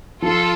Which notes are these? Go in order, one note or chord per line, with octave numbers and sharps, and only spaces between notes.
F3 F4 A4